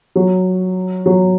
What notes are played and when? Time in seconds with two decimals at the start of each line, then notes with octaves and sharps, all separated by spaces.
0.16 F#3
1.06 F#3